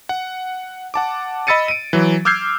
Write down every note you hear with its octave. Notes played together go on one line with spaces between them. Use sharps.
F#5
F#5 A5 D6
D#5 B5 E6 A6 C#7 D#7
D7 D#7
E3 F#3
D6 E6 F6 G6 G#6 C7